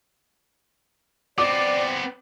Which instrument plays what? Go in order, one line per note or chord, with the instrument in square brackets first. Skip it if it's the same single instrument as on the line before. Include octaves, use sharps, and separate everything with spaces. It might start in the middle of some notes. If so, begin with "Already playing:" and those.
[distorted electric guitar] B3 C4 [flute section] D5 [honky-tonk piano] D6